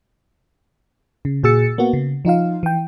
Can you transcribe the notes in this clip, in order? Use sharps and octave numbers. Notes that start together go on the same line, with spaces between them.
C#3
A#2 F#4 G#4 E6 A6 C#7
A#3 B3 F#4
C#3
F3 D#4 F4 F5
E3 G5